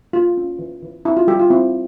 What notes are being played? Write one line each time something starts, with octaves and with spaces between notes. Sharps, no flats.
A#3 F4
C#4
E3
E3
C4 E4
F4
G3 G4
F4
C4 E4